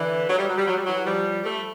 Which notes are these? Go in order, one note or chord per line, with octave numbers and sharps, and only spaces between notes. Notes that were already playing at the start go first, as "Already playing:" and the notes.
Already playing: D3 E3
F#3
G3
F#3
G3
F#3
G3
E3 F#3
F3 G3
G3 A3